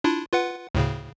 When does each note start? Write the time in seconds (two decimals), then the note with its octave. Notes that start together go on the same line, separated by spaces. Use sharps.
0.04 D4 E4 F4
0.32 F4 B4 F#5
0.75 D2 A2 C#3